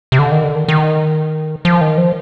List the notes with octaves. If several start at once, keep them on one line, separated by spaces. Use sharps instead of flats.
C3
D3
D#3
D3
D#3
D#3
F3
D#3
F3